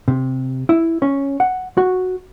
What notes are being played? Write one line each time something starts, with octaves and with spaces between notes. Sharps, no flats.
C3
E4
C#4
F#5
F#4